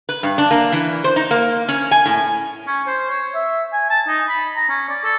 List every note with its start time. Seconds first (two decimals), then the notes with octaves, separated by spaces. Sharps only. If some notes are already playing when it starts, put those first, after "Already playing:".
0.09 B4
0.23 G2
0.38 D4
0.51 A#3
0.72 E3
1.04 C5
1.16 D#4
1.31 A#3
1.69 C#4
1.91 G#5
2.06 A2
2.67 C#4
2.87 C5
3.10 C#5
3.35 E5
3.73 G#5
3.90 A5
4.08 D#4
4.28 B5
4.57 A#5
4.69 C#4
4.89 D5
5.04 A4